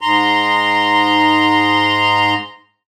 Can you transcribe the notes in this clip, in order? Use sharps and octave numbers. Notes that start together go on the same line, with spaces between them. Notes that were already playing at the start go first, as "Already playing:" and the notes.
G#2 A#5 C6